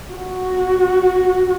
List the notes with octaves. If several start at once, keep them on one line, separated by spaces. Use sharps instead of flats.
F#4